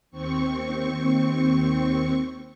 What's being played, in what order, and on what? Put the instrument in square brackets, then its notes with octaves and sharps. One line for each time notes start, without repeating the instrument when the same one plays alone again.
[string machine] D#2 C4 C#6